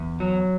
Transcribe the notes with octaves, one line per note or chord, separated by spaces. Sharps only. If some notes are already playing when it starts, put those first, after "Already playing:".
Already playing: E2
F#3